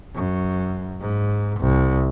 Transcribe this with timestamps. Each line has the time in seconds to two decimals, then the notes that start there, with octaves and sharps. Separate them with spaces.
0.15 F#2
1.00 G#2
1.60 C2